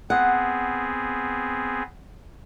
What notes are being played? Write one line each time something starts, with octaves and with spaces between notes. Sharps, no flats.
B3 C4 G#4 F#5